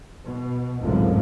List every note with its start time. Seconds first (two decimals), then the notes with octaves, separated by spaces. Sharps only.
0.23 B2
0.81 G#1 C#2 F#2 A2 F3